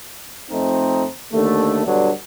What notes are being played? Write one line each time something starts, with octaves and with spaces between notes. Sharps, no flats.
F2 A3 C4 D#4
D#2 D3 A3
G2 B2 D3 F#3 D4